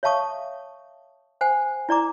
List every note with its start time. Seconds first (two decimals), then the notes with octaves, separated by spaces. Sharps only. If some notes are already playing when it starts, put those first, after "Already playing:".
0.03 C#5 E5 F5 A5 C#6 D#6
1.41 C5 F#5 G#5
1.89 E4 D5 A#5 D6